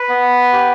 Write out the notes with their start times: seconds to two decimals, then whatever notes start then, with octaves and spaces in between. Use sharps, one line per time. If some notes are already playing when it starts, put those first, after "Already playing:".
Already playing: B4
0.09 B3
0.53 G4